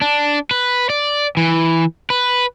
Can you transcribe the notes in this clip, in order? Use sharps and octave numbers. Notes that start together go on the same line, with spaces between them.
D4
B4
D5
E3
B4